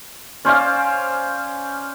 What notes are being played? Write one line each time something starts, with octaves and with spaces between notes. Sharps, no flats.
C#4 C5 D5 F5